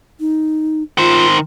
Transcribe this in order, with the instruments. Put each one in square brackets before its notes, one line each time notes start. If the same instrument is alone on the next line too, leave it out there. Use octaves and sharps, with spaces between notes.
[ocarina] D#4
[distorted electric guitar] D#3 C5 [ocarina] F4